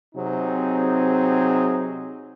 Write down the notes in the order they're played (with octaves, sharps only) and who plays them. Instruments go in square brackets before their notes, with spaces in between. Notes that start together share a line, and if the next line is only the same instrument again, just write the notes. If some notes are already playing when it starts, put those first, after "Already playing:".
[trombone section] C3 F#3 C4 D#4 G#4